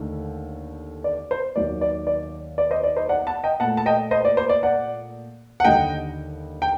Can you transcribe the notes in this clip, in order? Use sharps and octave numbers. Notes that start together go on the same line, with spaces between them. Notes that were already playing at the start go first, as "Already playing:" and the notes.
Already playing: D#2 D3 A3
D5
C5
D#2 D#3 F#3 A#3 D5
D5
D5
D5
C5 D#5
D5
C5 D#5
D5 F#5
F#5 A5
D#5 G5
A#2 A3 F#5 A5
A5
D#5 G5
C5 D#5
D5
C5
D5
D5 F#5
F#5
D#2 D3 G3 D#5 G5
G5